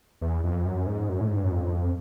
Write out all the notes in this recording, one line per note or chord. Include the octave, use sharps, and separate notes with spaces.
E2
F2
F#2
G#2
F#2
A2
G#2
G2
F#2
F2